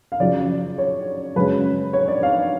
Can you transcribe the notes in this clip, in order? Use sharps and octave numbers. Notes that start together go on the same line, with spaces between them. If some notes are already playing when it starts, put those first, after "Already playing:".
F5
F#2 C#3 F3 D5
C#5
F#2 C#3 G#3 C#4 B4
C#5
D5
F5